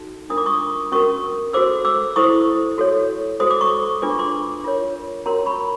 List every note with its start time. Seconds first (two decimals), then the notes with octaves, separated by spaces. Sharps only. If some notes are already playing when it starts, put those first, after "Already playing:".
Already playing: D#4 F#4 A4
0.30 D4 F4 A#4 D#6
0.38 D6
0.46 C#6 D#6
0.92 C#4 F#4 A#4 C#6 D#6
1.53 F#4 A4 C5 D6 E6
1.85 D6 E6
2.16 E4 A4 C5 C#6 D#6
2.78 F#4 A4 C#5
3.40 F#4 A4 C5 D#6
3.51 D6
3.61 C#6 D#6
4.02 D4 F4 G#4 B4 D6
4.10 C#6
4.19 C6 D6
4.64 F4 A#4 C#5
5.26 C#4 F#4 A#4 C#5 A#5 C6
5.46 B5 C#6